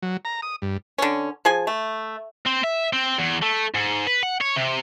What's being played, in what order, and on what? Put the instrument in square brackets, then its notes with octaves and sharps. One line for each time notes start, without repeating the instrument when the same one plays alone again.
[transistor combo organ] F#3
A#5
D#6
G2
[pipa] D3 C#4
F3 G#4 G#5
A3
[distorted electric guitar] C4
E5
C4
E2
A3
G#2
B4
F#5
C#5
C3